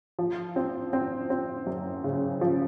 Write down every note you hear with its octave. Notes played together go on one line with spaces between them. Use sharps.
F3
C4
C4
C4
F#2
C#3
F3